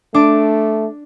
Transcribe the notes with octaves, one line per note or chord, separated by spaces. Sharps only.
A3 D4 D6